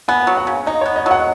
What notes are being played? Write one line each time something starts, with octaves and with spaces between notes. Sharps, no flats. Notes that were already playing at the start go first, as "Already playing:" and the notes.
B3 G#5
F#3
F#5
C#3
D#4 D#5
B3 C#5
D#5
F#3 F#5